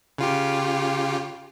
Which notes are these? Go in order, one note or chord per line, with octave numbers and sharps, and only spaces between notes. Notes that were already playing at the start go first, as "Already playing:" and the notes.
C#3 F4 G4